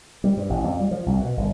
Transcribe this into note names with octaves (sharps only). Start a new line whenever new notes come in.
G3
G2
A1
F2
G3
F3
C2
B2
G1